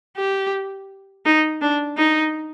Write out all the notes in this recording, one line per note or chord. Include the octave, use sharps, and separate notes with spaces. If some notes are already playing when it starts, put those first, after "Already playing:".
G4
D#4
D4
D#4